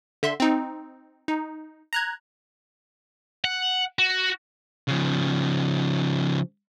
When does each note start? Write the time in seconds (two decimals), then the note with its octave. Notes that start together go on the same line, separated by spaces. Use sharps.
0.23 D3 E5 C6
0.40 C4 D#4
1.28 D#4
1.93 A#5 F#6 G#6
3.44 F#5
3.99 F#4
4.88 C#3 F3